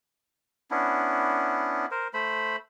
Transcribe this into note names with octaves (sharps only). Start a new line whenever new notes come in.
B3 C#4 D4 E4
A#4 C5
A3 C5 B5